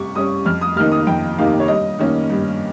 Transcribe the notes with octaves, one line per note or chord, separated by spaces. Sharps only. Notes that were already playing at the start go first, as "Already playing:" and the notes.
Already playing: C3 G3 C#6
G3 C#4 D#6
F2 F6
D#6
C3 D#3 A#3 D#4 F6
D#6
F2 G5
C3 D#3 A#3 D#4 F5
C#5
G2 D#5
D#3 A#3 C#4
G2